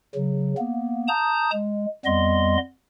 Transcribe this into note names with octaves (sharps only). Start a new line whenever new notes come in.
C#3 F#3
A#3 B3
A5 A#5 D#6 G6
G#3
F2 G3 B3 D#5 C6